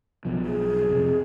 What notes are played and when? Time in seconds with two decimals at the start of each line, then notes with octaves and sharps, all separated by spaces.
0.25 B1 B2 F3
0.45 G#4
0.89 F2 C3